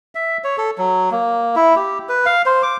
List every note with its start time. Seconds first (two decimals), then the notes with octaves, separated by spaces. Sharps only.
0.15 E5
0.44 C#5
0.58 A4
0.78 F#3
1.11 A#3
1.56 E4
1.76 G4
2.09 B4
2.26 F5
2.46 C5
2.63 D6